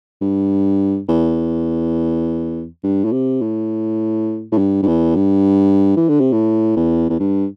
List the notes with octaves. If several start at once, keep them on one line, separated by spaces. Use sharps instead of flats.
G2
E2
G2
A2
C3
A2
A2
G2
G2
E2
G2
E3
D3
C3
A2
E2
E2
G2